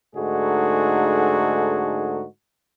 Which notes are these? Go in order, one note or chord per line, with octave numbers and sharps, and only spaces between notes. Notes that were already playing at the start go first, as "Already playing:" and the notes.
G#2 D3 A3 D#4 F#4 G#4